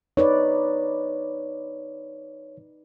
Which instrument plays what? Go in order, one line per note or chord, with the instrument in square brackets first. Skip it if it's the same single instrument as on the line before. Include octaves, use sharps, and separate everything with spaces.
[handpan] D#4 B4 D5 [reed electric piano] C#5